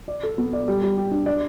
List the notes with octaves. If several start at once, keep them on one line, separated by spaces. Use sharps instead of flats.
D5
A4
B3
D5
G3
G3
G4
D4
D5